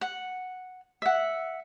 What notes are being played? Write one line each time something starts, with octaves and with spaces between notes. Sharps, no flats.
F#5
E5 F#5